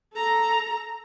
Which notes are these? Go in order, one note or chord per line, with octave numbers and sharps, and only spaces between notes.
A4 A#5